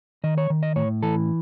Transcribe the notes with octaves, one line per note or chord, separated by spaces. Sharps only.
D#3 D#5
C#5
D#3
D#5
A2 C#5
E3 A4